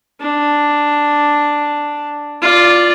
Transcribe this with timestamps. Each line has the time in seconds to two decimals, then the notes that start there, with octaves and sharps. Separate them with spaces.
0.21 D4
2.41 F4 D5